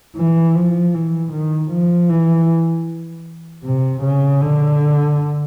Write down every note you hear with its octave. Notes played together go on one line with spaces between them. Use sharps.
E3
F3
E3
D#3
F3
E3
C3
C#3
D3